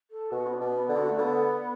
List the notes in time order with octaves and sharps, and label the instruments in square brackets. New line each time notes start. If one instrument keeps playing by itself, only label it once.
[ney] A4
[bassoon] B2 [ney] F#4
[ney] B3
D4
[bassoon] B2
[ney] D4
B3
[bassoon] D3
[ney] F#4
A3
[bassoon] D3 [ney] B3